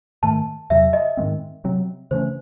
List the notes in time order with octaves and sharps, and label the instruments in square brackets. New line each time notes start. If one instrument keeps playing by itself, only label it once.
[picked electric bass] G#2 D#3 A3 [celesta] A5
[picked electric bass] E2 C3 F#3 [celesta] E5
[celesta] D#5
[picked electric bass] G#2 D#3 G#3 C4
C3 F#3 C4
[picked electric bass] C#3 E3 A3 C#4 [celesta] C5